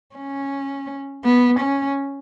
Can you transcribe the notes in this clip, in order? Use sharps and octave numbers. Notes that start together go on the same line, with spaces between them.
C#4
B3
C#4